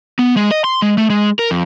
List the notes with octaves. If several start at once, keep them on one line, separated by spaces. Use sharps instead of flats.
B3
G#3
D#5
C6
G#3
A3
G#3
A#4
F2